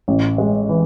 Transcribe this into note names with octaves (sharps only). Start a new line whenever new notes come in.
A1
G#3
E3